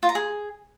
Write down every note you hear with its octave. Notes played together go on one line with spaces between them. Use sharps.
F4
A#5
G#4